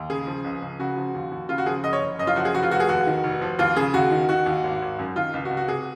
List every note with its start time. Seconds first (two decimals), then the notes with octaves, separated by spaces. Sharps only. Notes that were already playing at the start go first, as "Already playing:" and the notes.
Already playing: D#2
0.10 C#3 G#4
0.27 F3
0.44 C#2
0.62 C#2
0.79 C#3 F#4
0.97 F3
1.14 D#2
1.31 D#2
1.49 C#3 F4
1.58 F#4
1.66 F3 G#4
1.84 F#1 D#5
1.93 C#5
2.02 F#1
2.19 F#2 D#5
2.27 F4
2.36 F3 F#4
2.45 G#4
2.54 F1 F#4
2.63 F4
2.71 F1 F#4
2.80 G#4
2.89 D#2 F#4
3.07 D#3
3.24 F1
3.42 F3
3.59 D#2 F4
3.76 C#3 G#4
3.94 D#2 F#4
4.11 D#3
4.29 D#3 F#4
4.46 D#2
4.64 G#1
4.82 G#1
4.99 F#2
5.16 D#3 F4
5.34 C#2
5.45 F#4
5.51 C#2
5.57 F#4
5.68 C3 G#4